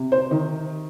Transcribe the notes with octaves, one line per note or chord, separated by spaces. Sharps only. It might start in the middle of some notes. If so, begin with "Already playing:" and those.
Already playing: C3
C5
D#3